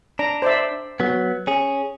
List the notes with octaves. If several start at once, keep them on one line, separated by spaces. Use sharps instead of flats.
D4 A#5
C5 D5 E5
F#3 B3
C#4 G#4